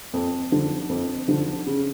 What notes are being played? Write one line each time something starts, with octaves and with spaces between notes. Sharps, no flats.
F2
D3 F3
F2
D3 F3
C#3